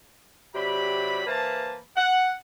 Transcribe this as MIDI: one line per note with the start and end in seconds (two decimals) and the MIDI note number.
0.54 1.23 48
0.54 1.23 54
0.54 1.23 67
0.54 1.23 74
0.54 1.23 83
1.27 1.78 52
1.27 1.78 58
1.27 1.78 71
1.27 1.78 72
1.27 1.78 81
1.96 2.31 78